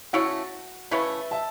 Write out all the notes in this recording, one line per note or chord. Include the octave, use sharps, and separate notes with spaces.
C#3 A3 E4 F#4 C#5
C#3 A3 E4 B4 C#5 E5
E5 A5